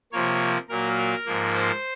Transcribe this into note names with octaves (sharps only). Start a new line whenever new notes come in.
C3 F3 A#3 C#5
A#2 F#3 A#3 A#4
A#4
G#2 F3 A#3
C5